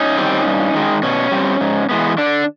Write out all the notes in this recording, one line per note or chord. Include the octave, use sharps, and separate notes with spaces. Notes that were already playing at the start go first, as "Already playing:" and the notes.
Already playing: C#4 D#4
D#3 G3 C4
G2
D#3 G#3
B2 C#4
G3 C4
G#2
E3 G#3 B3
D3 D4